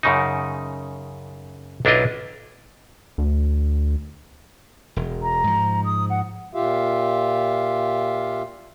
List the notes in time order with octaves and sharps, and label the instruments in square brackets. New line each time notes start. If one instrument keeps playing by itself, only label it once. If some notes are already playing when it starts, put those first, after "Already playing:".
[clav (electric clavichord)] F#2 C#3 D#4
B1 D4 E4 F4 D#5
[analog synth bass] D2
[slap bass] E1
[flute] A#5
[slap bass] G#2 F3
[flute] D#6
F#5
[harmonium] A#2 F4 G4 E5 F5